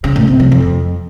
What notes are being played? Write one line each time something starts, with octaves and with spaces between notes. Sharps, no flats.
C#3
A2
C3
F3
F2